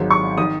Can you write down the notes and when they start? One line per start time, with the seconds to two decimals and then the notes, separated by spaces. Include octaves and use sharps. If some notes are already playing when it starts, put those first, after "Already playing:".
Already playing: G#1 G#2 D#3 F#3
0.11 C#6
0.38 D#3 D#6